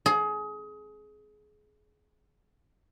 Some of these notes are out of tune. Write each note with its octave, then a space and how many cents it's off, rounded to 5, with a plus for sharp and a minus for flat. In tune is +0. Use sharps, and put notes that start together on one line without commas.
G#4 +25